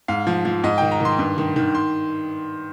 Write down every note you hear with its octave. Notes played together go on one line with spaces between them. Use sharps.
G#2 F5
F3
F3
G#2 D#5
D#3 G5
A#5
D#3 C6
G2
D#3
D#3
C6